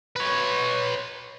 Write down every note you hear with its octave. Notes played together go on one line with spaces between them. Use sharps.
B4 C#5